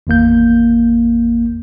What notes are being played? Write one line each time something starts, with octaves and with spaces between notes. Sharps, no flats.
G#1 E2 A#3 G6